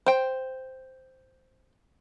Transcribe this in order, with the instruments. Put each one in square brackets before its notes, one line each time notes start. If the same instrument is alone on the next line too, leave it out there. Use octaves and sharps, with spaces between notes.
[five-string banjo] C5 G5